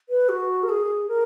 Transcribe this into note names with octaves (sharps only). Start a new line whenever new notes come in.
B4
F#4
A#4
G#4
A#4